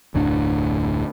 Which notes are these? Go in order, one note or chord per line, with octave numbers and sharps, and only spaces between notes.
F1 D2 A2 D4